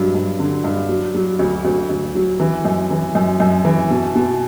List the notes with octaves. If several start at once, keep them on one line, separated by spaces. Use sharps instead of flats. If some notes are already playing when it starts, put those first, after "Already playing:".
Already playing: G2 F#3
G2
D3
G2
F#3
F#3
D2
D2
D2
F#3
E3
F#2
E3
F#2
F#2
E3
B2
B2